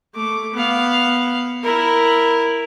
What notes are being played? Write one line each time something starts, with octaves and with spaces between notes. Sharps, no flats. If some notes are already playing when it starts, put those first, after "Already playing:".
A3 D6
B3 F5
E4 A#4